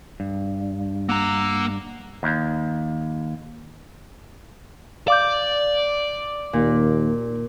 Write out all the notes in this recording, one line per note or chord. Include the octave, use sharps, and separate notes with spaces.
G2
A#3 F#5 A#5 D6 E6
D#2
D5 F5 D6 G6
D#2 A#2